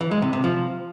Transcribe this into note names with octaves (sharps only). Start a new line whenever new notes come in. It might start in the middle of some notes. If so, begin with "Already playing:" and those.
E3
G#3
C3
C3
F3